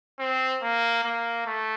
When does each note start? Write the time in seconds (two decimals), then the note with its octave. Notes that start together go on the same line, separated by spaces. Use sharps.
0.19 C4
0.62 A#3
1.04 A#3
1.46 A3